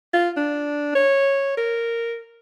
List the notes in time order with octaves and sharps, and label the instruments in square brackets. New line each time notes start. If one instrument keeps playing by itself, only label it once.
[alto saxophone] F4
D4
C#5
A#4